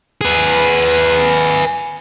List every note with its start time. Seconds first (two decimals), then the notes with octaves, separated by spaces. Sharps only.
0.21 G#4 B4